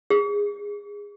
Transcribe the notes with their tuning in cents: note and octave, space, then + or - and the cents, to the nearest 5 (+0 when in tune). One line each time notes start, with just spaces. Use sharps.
G#4 -20